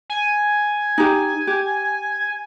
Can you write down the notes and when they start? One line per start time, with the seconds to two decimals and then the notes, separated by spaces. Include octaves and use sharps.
0.10 G#5
0.98 D#4 G4
1.47 G4